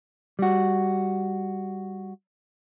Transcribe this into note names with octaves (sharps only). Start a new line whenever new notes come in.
G3 F#4